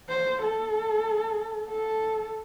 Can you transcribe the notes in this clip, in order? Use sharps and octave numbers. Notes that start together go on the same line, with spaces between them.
C5
A4
A4